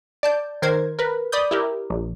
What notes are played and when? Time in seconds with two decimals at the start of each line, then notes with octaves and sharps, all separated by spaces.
0.23 D5 A5 G6
0.62 D#3 A#4 C5 G#6
0.99 A#4 B4
1.32 D5 B5 D#6 G6
1.51 E4 G4 A#4
1.90 A#1